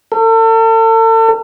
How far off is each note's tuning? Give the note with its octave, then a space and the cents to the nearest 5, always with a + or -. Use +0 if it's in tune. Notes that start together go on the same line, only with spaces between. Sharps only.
A4 +40